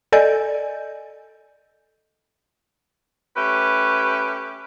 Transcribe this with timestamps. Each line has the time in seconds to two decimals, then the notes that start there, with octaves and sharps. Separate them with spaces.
0.12 A4 D5 D#5 G#5 G6
3.36 A3 C#4 G4 B4